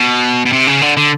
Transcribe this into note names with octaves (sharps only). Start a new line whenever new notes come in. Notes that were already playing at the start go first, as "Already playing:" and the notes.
Already playing: B2
B2
C3
C#3
D3
D3